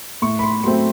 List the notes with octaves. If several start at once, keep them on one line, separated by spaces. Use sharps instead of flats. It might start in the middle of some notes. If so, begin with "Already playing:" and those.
A2 C#6
B5
C6
F#3 A3 C4 C6